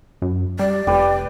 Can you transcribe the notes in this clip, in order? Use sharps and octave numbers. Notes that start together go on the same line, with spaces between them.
F#2
G3 D5
F1 G4 B4